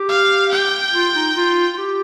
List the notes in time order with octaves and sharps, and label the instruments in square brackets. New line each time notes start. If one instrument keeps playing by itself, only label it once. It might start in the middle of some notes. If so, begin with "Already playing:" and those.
Already playing: [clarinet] G4
[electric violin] F5
G5
[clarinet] F4
D#4
F4
F4
G4